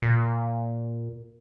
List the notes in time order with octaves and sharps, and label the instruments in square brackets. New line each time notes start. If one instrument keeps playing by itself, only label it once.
[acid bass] A#2